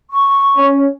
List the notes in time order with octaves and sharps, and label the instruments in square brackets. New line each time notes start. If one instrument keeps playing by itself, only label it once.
[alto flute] C#6
[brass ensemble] C#4